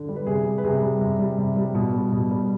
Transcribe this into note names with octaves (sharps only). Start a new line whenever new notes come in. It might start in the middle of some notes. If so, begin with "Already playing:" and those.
Already playing: D3
G3
B4
C3 G#4
G3
B4
C3 G#4
G3
C3
G3
C3
G3
B2
G3
B2
G3